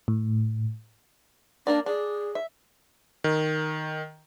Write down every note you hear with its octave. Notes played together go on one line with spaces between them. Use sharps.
A2
A#3 D4 A#4 D5
D4 G#4
E5
D#3